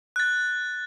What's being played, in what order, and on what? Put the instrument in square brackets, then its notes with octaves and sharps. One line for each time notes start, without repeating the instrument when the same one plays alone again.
[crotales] F#6 A6